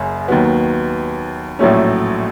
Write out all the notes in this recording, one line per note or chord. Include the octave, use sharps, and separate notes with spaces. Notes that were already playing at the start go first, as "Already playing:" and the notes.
Already playing: F#1 F#2 C#3
D#2 D#3 F#3 B3
A#1 A2 F#3 A3 C#4